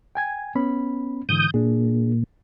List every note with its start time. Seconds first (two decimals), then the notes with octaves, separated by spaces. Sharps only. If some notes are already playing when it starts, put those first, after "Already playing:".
0.15 G5 G#5 G#6
0.55 B3 C#4 B5
1.29 G#2 D3 E3 D#6 G6
1.54 A#2 D4 G#4